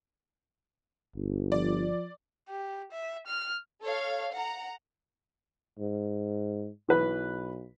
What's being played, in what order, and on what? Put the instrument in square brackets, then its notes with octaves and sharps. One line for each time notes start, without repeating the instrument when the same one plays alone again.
[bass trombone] G1
[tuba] F3 [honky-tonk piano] D5
[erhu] G4
E5
F6
[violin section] A4 C#5 F5
F#5 A#5
[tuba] G#2
[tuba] B1 [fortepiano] E3 B4